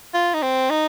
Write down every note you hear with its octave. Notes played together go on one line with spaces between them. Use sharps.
F4
D#4
C4
D#4